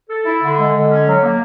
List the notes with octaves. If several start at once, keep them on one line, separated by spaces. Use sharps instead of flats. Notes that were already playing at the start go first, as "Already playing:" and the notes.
A4
E4
D3
G#3
D3
C#4
F#3
A#3